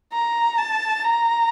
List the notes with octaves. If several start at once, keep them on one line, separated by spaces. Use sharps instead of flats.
A#5
A5
A#5